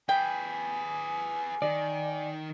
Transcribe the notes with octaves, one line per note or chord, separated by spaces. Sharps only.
G#4 B4 G5 G#5
D#3 D5